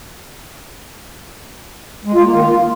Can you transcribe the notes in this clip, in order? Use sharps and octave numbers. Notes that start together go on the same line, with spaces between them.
G#3
F4
A#3
D#3
F4